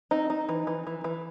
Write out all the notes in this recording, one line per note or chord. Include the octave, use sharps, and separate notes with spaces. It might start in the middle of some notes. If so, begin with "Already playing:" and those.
C4 D#4
D#4
E3
E3
E3
E3